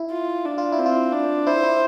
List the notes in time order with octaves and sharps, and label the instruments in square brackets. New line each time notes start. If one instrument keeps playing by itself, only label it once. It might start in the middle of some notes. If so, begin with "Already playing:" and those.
Already playing: [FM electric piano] E4
[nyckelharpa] F4
D4
[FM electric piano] F4
E4
[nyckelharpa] C4
[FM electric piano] F4
[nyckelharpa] D4
[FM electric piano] E4 [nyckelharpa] C5
[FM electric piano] E4